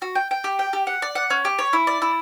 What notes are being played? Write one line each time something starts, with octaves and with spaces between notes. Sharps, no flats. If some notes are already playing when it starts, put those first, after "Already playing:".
F#4
G5
G5
G4
G5
G4
F#5
D5
F#5
C#4
G4
C#5
E4
D5
E4